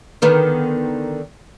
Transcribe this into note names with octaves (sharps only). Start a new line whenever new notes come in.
D3 D#3 B3